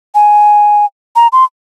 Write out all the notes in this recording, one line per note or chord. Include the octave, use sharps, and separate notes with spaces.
G#5
A#5
C6